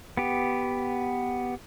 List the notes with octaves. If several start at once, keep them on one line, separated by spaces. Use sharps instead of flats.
B3 G4